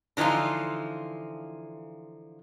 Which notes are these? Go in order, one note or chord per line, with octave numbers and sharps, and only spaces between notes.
D3 E3 F3 D#4 F4